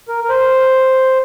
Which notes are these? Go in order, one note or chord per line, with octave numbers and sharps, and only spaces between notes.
A#4
A#4
C5